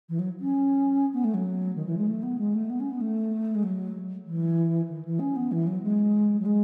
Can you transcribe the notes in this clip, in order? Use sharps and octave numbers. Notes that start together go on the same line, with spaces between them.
E3
F#3
C#4
B3
A3
F#3
D#3
E3
G#3
A3
B3
G#3
A3
B3
C#4
B3
A3
G#3
F#3
E3
D#3
E3
C#4
B3
E3
F#3
G#3
F#3
G#3